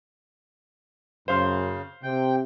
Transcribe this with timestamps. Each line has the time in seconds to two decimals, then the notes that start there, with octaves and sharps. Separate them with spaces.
1.28 F#2 C#3 C5 F5 C6
2.03 C3 G5